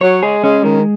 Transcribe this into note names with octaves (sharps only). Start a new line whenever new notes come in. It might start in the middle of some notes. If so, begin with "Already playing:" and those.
F#3 C#5
G#3 G#4
G#3 C#4
D#3 G#3